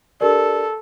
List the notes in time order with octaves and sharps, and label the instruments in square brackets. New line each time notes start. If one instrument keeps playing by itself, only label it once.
[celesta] D4 G4 A#4 D5 [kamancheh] A4